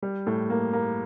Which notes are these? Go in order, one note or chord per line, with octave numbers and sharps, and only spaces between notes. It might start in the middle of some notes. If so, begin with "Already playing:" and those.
G3
A2
A#3
A#3